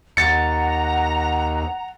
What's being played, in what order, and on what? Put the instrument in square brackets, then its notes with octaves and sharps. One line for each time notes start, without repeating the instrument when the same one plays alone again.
[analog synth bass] D#2 [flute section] F#5 A#5 [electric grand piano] A6 C#7